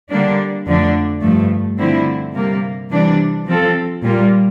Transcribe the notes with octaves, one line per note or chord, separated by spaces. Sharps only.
D3 G3 A#3 D4
F2 D3 F3 A3 D4
G2 F3 A3
D3 F3 C4 E4
C3 G3 A#3
C3 E3 G3 D4
F3 C4 F4 A4
A#2 G3 A#3 F4